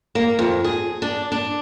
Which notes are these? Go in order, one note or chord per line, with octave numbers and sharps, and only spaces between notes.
A#3
F2
G#4
D4
D4